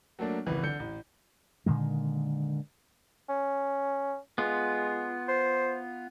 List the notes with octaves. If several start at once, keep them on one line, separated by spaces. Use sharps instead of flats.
F#3 A3 A#3 D4
G#1 C#2 E3 B4
D3 G6 C#7
A1
A#2 D3 D#3 G#3
C#4
G#3 B3 F4
C5